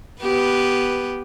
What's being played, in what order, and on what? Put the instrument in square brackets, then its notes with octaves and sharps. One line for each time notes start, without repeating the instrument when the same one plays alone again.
[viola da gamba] B3 G4 B4